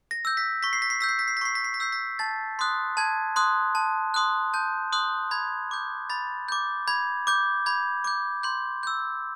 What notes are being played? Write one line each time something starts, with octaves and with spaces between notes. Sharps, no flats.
A#6
E6 G6
B6
C#6 B6
C7
B6
C7
E6 G6 B6
C7
B6
C7
B6
C#6 C7
B6
C7
B6
E6 G6 C7
B6
A5 A6
C6 D#6 F#6
A5 G#6
C6 D#6 F#6
A5
C6 D#6 F#6
A5 G6
C6 D#6 F#6
B5 G#6
D6 G6
B5 A6
D6 G6
B5 G#6
D6 G6
B5 G#6
D6 G6
C6 G6
E6 G6